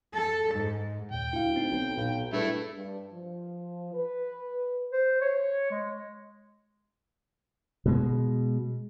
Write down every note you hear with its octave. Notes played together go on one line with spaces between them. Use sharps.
A4
G#2
D#2 A#2 G5
D2 E4 F5
C4 D#4
B1
B1 A#2 F5
G2 A3 E4 G#4 B4
G2
F3
B4
C5
C#5
G#3
B2 G#3